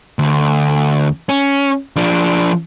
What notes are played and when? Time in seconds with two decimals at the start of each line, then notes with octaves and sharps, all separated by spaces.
0.19 D2
1.29 C#4
1.96 F3 D4